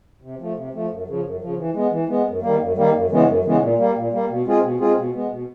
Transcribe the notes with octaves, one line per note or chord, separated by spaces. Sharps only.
C3
F3 A3
C3
F3 A3
F#2
C#3 F3
F#2
C#3 F3
E3
G#3 B3
E3
G#3 B3
F#2
D#3 G3 A#3
F#2
D#3 G3 A#3
F#2
C#3 E3 G#3 B3
F#2
C#3 E3 G#3 B3
A#2
G3 A#3
A#2
G3 A#3
B2
G#3 C4 F4 G#4
B2
G#3 C4 F4 G#4
B2
G#3 B3
B2